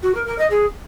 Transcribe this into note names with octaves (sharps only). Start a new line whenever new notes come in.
F#4
A#4
A#4
D#5
G#4